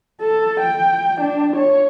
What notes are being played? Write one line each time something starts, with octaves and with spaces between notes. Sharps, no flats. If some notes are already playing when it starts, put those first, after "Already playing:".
A4
G5
D4
C#5